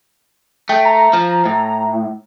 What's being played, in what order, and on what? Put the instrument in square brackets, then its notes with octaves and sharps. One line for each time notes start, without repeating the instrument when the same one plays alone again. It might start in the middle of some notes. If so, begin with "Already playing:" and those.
[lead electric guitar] A3 [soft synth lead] G5
[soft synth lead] A#5
[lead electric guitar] F3
A2